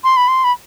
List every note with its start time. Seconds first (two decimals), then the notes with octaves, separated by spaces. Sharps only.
0.04 C6
0.17 B5
0.28 C6
0.44 B5